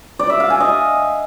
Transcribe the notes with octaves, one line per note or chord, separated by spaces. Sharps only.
D5
E5
F5
G#5
D#5